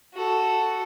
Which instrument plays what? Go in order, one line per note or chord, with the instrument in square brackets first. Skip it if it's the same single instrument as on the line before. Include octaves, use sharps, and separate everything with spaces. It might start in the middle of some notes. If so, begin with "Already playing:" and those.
[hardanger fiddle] F#4 A4